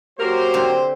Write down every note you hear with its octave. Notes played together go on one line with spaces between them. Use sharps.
F#3 A#3 G4 A#4 C5
D3 C4